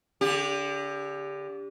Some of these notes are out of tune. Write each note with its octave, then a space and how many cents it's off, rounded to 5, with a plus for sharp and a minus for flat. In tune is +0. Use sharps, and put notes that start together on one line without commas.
D3 -30 G4 +20